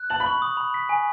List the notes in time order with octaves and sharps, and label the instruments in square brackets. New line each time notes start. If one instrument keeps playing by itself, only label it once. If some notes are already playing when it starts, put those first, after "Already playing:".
Already playing: [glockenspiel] F#6
[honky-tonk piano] A5 [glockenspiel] F#7
[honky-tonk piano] B5
[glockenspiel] C#6
D#6
B5
B6
G#5